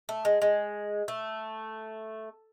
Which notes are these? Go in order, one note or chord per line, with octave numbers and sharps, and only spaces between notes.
A3
G#3
G#3
A3